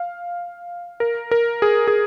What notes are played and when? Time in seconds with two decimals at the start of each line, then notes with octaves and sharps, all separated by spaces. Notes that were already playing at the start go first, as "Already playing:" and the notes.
Already playing: F5
1.00 A#4
1.31 A#4
1.62 G#4
1.87 G#4